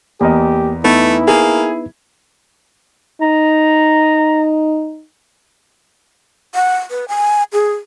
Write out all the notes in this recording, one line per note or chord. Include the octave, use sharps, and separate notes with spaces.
E2 A#3 G4 A#4 D#5
A3 B3 D#4 E4 B4
A#3 G#4
D#4 A#5
F#5
B4
G#5
G#4